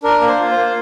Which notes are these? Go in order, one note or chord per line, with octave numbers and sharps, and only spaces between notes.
D4 A#4
A#3
C5
F4
C5
A#3